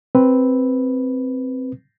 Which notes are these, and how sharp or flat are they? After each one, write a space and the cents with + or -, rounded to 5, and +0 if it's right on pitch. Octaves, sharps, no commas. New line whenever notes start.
C4 +0 B4 +0